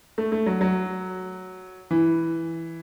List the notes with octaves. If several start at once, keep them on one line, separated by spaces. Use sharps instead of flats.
A3
A3
F#3
F#3
E3